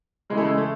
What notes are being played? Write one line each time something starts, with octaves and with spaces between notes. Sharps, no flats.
C#3 E3 G#3
A3
G#3
A3